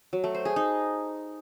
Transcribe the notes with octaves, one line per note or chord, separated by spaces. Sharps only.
F#3
A3
C5
G#4
D#4